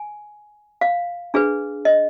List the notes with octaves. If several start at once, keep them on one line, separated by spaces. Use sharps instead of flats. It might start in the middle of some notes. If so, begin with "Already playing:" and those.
Already playing: G#5
F5
D4 G#4 B4
D#5